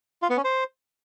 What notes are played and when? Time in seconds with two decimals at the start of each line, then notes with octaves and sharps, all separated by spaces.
0.22 F4
0.30 B3
0.37 C#4
0.44 C5